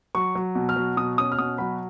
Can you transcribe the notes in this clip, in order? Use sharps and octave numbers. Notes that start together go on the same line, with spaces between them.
F#3 C#6
F#3
B2
F6
F#3
B2 D#6
C#4 D#6
F6
B2 D#6
F#3 B5